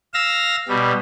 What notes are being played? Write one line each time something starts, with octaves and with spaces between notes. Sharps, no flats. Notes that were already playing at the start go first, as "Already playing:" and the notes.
F5 E6 A#6
B2 G3